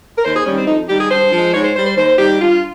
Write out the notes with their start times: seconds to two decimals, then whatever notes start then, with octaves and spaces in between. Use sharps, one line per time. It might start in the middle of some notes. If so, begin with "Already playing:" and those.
0.18 A#4
0.24 D#2 C5
0.35 G#4
0.46 D#3 G3 C#4
0.57 C4
0.67 F2 D#4
0.89 D#3 G3 G4
0.99 G#4
1.11 G2 C5
1.32 F3 G#3
1.53 G#2 C#5
1.64 C5
1.75 G3 C5
1.86 C5
1.97 D#2 C5
2.18 D#3 G3 G4
2.40 G2 F4